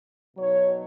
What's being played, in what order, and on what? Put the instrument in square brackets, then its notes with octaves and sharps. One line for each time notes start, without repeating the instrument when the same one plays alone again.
[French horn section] B2 F#3 D#4 C#5